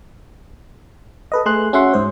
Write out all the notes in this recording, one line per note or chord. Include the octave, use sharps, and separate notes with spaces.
A4 B4 D#5
A3 G#4 C6 F#6
C#4 F#4 E5 F#5 C6
G#2 C5